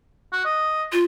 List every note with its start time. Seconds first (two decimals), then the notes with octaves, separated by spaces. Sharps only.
0.33 F#4
0.45 D#5
0.93 F4